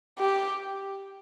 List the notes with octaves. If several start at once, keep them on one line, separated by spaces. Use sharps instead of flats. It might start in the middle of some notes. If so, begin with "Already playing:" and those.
G4